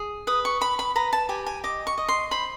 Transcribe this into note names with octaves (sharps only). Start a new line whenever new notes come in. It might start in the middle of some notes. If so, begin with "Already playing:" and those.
Already playing: G#4
B4 D#6
C#6
B4 B5
B5
B4 A#5
A5
G4 G#5
G#5
D#5 D6
C#6
D#5
C6
C5 B5